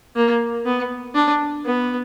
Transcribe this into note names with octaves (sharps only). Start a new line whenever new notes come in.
A#3
B3
D4
B3